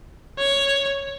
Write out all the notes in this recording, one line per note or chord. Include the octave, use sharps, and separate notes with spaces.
C#5